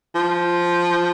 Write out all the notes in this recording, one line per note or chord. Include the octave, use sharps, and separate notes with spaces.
F3